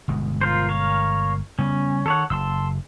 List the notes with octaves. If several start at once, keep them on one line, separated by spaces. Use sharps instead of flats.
G1 B2 G#3
F4 A#4 C5
A#4 C#5 F5
C#3 G3 B3 C#4
D#3 A4 C#5 F#5
F#1 A5 C6 E6